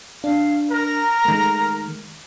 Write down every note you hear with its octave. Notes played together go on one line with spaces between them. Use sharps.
D4 F5
A#4 A#5
D#3 G#3 A3